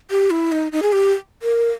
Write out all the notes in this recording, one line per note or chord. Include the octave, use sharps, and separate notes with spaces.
G4
E4
D#4
D#4
G#4
G4
A#4